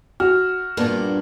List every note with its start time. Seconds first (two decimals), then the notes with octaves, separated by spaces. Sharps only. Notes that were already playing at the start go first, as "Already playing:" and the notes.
0.20 F#4 F6
0.77 G2 A#2 A#3 B3 D5